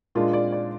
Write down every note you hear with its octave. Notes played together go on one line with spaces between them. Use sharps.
A#2 G#3 D4 F4
D5
D5